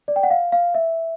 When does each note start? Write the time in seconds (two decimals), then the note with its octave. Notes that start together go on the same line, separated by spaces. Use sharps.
0.08 D5
0.16 G5
0.23 F#5
0.30 F5
0.52 F5
0.74 E5